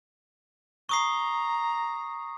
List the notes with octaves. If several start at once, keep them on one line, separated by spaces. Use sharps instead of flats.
A#5 C#6 D#6 C7